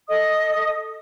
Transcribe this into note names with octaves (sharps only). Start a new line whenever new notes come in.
A4 D#5 D#6